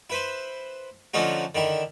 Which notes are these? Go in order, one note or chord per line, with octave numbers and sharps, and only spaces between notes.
E4 B4 C5
D3 F3 A3 C#4 D#4 F#4
D3 D#3 E4